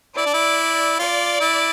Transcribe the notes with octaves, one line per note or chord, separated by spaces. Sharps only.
E4 D5
D4
E4
F4 D5
E4